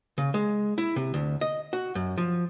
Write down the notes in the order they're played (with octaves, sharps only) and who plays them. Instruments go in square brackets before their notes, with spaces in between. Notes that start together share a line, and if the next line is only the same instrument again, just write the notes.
[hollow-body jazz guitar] C#3
G#3
E4
C3
D2
D#5
F#4
F#2
F3